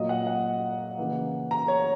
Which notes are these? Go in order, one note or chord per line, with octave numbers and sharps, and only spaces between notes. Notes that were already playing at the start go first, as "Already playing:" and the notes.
Already playing: A#2 F#3 A#3 D#5
F#5
F#5
C#3 E3 A#3
A#5
C#5